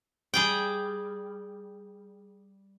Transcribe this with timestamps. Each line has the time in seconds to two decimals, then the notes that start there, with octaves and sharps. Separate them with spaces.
0.34 G3 G#4 G5